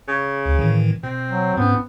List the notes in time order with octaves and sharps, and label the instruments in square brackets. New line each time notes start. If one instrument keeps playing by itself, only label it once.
[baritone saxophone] C#3
[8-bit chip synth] D2
A2 D#3 E3
[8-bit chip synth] B2 [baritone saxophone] C4
[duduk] F#3
[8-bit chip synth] G#2 C#4 [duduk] B3